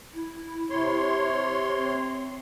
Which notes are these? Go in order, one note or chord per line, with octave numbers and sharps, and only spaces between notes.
E4
C3 C#5 C6
C4